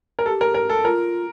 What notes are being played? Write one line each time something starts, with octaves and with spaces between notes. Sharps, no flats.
A#4
G4 A4
A#4
A#4
A4
F4 A#4